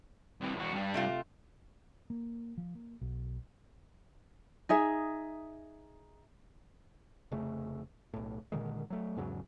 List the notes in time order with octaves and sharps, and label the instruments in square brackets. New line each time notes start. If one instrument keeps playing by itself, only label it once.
[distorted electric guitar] C2 E3
E2 F#4
G2 G3
[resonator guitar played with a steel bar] C3 A3 F4
[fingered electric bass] A#3
F3
A#3
B1
[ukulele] D#4 G#4 E5
[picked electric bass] F1 C#3 A3
B1 A2
A#2 D3 D#3 G#3
F#3 A3
E2 G#2 C#3 F#3